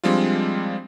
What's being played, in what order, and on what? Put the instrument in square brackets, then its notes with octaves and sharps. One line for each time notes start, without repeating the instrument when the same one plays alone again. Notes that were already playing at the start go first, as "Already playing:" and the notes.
[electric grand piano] F3 G3 G#3 C4 D4 F4